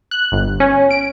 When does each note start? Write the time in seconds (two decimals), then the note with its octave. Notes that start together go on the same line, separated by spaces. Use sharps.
0.11 F#6
0.32 G1
0.60 C#4
0.91 D7